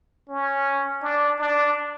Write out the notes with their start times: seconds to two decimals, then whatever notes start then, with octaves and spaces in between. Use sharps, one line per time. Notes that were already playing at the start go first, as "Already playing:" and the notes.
0.28 C#4
1.02 D4
1.39 D4